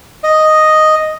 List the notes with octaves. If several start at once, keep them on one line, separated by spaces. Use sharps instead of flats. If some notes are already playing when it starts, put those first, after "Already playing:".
D#5